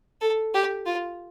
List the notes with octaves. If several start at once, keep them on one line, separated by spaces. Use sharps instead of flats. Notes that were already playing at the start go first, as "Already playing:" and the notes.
A4
G4
F4